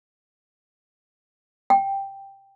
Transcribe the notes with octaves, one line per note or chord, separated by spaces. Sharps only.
G5